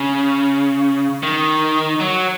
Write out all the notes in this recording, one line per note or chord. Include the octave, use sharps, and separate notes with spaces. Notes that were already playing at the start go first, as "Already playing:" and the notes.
Already playing: C#3
D#3
F#3